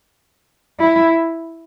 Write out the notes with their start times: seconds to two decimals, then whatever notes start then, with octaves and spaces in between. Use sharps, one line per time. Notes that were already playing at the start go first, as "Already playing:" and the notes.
0.79 E4